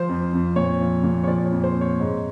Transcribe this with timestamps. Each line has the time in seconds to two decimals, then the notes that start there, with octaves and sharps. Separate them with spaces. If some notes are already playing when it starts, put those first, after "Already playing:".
Already playing: F3 C5
0.09 F2
0.33 F2
0.56 A#2 C#5
0.81 F3
1.03 A#2
1.23 C#5
1.27 F3 D5
1.46 C#5
1.52 F2
1.64 C5
1.75 F2
1.81 C#5
2.00 G#2